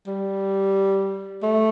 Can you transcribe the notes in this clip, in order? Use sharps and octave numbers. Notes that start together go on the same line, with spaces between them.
G3
A3